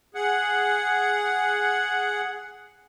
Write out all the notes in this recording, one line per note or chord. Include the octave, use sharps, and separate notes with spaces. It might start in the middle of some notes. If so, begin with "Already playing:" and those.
G#4 F#5